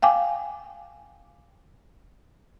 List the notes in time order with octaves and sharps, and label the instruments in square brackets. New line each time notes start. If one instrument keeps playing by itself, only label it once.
[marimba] F5 G5 G#5 D6